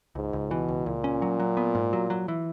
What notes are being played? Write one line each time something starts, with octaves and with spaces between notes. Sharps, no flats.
C#2 G#2
C#2
B2 E3
C#2
C#2 A#2
C#4
F#3
F#3
B3
G#2
F#3
F#3
E3